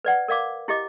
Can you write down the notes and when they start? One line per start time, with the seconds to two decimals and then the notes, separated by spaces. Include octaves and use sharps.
0.05 B4 D5 F#5
0.28 A#4 D5 F5 D6
0.68 E4 G4 D#5 D6